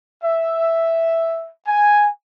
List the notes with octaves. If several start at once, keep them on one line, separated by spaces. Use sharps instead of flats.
E5
G#5